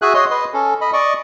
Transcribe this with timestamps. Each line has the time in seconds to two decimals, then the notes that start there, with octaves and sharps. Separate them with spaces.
0.02 F#4 G#4 E5 G#5 F#6
0.15 C#5 D#5 C6
0.31 B4 D#5 C6
0.54 C#4 A4
0.81 D#5 B5
0.93 D5 D#5 C#6